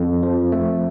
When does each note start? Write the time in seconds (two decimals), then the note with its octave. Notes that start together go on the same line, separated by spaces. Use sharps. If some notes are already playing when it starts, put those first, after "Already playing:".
Already playing: F2
0.23 F3
0.52 A3